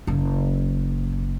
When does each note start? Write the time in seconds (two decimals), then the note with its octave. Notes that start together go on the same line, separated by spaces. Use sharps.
0.07 F#1 A#3